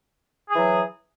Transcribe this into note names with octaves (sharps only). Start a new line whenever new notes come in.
E3 F#3 G#4